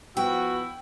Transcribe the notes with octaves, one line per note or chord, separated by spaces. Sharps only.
F3 B3 E4 F#4 G5